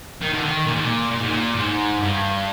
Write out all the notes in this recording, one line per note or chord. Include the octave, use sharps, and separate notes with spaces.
D#3
D3
D#3
A#2
G#2
A#2
A#2
G#2
A#2
G#2
G2